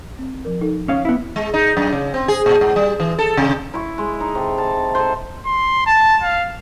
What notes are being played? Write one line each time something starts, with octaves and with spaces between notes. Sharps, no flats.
C4
F3 A#4
D#4 A4
C#4 F5
B3 E4
G#3
D#4
F#2
C#3
C4
G#4
A#2
G#2
G3
E3
A4
C3
E4 C#6
G#3
D#4
C3 A4
A5
A4 C5
C6
A5
F5